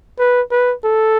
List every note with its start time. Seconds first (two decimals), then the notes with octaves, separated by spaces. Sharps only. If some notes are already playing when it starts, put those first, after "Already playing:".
0.19 B4
0.51 B4
0.84 A4